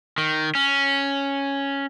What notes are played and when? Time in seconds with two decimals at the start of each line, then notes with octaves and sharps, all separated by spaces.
0.18 D#3
0.55 C#4